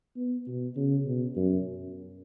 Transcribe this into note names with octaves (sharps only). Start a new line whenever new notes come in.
B3
B2
C#3
B2
F#2